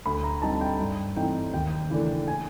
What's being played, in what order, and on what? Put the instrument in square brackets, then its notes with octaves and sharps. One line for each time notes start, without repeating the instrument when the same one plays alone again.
[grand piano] D2 B5
A#5
D3 G3 C4 D#4 A5
G5
G2
E3 A3 C4 D#4 G5
D#2 G5
C#3 E3 A3 D4
G#5